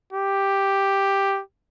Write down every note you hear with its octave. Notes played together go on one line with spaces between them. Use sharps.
G4